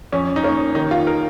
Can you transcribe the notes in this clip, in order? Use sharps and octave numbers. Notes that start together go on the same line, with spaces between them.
F2 C#4
D#4
A#3 C#4
D#3 D#4
F4
A#4